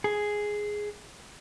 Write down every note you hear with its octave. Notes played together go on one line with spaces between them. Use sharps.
G#4